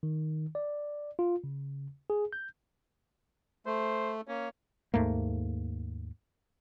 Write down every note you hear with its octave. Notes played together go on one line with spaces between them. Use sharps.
D#3
D5
F4
C#3
G#4
G6
A3 C5
A#3 C#4
D#2 G#2 A3 A#3